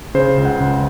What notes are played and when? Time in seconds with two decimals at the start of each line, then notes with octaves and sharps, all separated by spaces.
0.15 C#3 C5
0.38 C#2
0.45 F#5
0.61 C#2